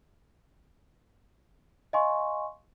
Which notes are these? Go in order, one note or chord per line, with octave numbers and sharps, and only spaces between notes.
D#5 F5 G#5 C6 C#6